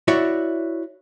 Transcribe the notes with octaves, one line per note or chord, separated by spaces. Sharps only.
E4 F#4 C#5 D5 E5